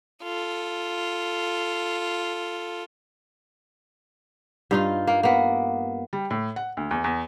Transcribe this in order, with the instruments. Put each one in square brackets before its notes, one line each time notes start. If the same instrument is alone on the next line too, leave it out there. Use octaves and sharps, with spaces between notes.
[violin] F4 A4
[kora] G2 D#4 F4
A#3
A#3 B3
[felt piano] G3
A2
F#5
D2
E2
E2